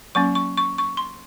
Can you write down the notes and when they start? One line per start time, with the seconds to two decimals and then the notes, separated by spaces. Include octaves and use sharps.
0.15 F#3 A#3 C#4 C#6
0.35 C#6
0.57 C#6
0.78 C#6
0.97 C6